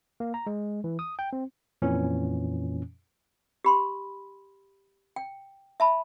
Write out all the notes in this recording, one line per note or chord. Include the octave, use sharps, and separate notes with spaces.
A#3
A#5
G#3
E3
D#6
G5
C4
F2 A#2 E3 C#4
G4 B5 C6
G5
E5 A5 B5